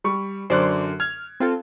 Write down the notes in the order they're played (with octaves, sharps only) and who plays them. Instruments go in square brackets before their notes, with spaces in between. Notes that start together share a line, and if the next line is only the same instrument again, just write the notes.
[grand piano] G3 C#6
[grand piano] F#2 D3 F#6 [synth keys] C5 D5
[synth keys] F6 [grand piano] G#6
[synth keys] C4 F4 A4